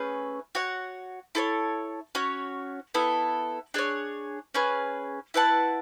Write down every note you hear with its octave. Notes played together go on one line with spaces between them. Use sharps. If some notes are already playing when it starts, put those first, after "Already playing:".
Already playing: A3 C#4 G#4 B4
F#4 C#5 F#5
E4 A4 C#5
C#4 F#4 C#5
B3 E4 A4
D4 G#4 C#5
C#4 G#4 B4
E4 B4 F#5 A5